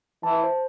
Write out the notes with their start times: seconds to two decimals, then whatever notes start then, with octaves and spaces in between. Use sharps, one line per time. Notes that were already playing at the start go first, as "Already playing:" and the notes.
0.23 E3 A5
0.44 C5